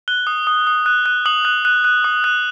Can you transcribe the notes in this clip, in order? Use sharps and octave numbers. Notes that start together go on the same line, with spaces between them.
F#6 G7
D#6
D#6
D#6
F#6
F#6
D#6 F#7
F#6
F#6
F#6
D#6
F#6